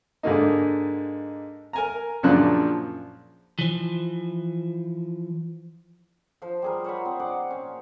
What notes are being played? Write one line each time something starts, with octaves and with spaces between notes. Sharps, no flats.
G#2 D3 A#3 D#4
A#4 G#5 A#5
F#2 A#2 C#3 F3 D4 F#6
E3 F3
F3 F4 C5
G3 G#4 A#4
C5 C#5 F#5 B5
C4
D#4 D5 F#5
A#2 C#4